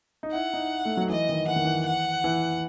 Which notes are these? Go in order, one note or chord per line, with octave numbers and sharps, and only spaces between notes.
D#4
E4 F#5
D#4
A3
F#3
E3 D#5
D#3
E3 F#5
D#3
E3
F#5
E3